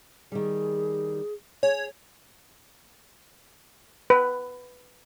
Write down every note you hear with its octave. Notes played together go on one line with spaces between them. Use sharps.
D#3 G3 G#4
G#4 C#5
B4